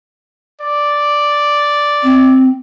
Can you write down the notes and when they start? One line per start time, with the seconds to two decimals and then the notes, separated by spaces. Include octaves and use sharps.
0.61 D5
2.03 C4